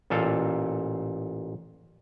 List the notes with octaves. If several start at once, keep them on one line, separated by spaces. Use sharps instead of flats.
A1 A#2 A4 F5